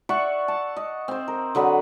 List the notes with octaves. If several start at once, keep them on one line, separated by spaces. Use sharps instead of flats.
D5 E5 F#5 C#6
A5
D#5
C4 C5
A#4
D3 F#3 D#5 B5